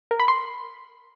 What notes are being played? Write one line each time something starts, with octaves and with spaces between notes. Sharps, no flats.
A#4
B5
C6